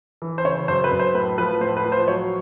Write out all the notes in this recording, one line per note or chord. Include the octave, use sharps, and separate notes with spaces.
E3
C5
C#3 C#5
F#2 C5
B4
F#2
C5
A2 B4
F3 B4
A2 C5
B4
F3
C5
F#3 C#5